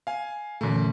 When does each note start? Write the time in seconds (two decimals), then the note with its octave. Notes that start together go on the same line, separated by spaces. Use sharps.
0.07 F5 G#5
0.61 F#2 A#2 D3 E3 A3